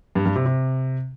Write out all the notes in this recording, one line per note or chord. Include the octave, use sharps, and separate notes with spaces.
G2
G2
C3
C3